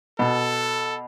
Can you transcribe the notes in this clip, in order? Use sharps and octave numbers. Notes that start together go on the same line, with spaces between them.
B2 A4